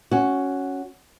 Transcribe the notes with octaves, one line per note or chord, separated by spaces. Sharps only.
C#4 F#4